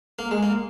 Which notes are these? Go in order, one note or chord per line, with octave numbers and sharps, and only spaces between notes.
A#3
G#3
A#3